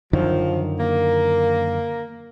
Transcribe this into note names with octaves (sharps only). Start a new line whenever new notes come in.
F#2 D3 D#3 F3
A#3